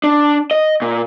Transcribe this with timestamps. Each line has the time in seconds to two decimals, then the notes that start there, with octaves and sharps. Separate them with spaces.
0.04 D4
0.51 D#5
0.82 A#2